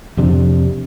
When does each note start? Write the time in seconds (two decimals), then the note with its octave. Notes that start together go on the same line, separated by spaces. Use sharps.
0.17 F2 C3 D4